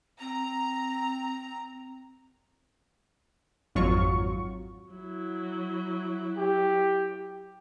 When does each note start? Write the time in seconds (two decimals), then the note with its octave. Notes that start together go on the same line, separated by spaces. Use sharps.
0.20 C4 A#5
3.75 G#1 F2 F#3 F4 C#6
4.92 F#3 E4
6.38 G4